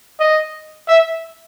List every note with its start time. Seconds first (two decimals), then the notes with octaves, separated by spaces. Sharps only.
0.19 D#5
0.88 E5